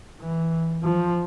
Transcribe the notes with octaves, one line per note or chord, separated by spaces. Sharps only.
E3
F3